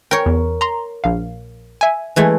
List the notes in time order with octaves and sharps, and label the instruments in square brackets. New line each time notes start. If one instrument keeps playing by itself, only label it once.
[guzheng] A#4 C#5 [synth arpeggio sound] G5
[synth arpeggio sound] E2
A#5 C6
A#1 F5
E5 G#5
[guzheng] E3 G#3 A3